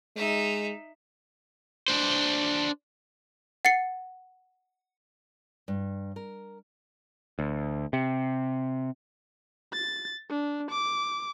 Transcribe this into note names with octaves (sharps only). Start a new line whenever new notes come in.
G#3 D#4 E5
D4 C5
F#5 A6 C7 C#7
G2
A#4
D2
C3
A6
D4
D6